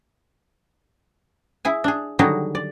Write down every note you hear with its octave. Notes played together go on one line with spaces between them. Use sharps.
E4 G#4 G#5
D4 G#4
D3 D#3 F#3 G3 D#4 G#4
D5